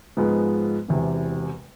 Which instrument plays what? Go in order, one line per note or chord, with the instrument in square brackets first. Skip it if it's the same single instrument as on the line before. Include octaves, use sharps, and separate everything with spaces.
[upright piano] G#2 F3 G#3 B3
E1 E2 C3